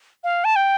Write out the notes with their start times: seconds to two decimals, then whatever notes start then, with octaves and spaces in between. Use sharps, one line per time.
0.24 F5
0.45 A5
0.56 G5